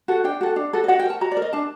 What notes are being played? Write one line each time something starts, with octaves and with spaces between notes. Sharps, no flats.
F#4 A4
D4 G5
F#4 A4
D4
F#4 A4
D#5
F#4 F#5
G5
A#4 A5
F#4 A#5
D5
A#4
D#5
D4 A5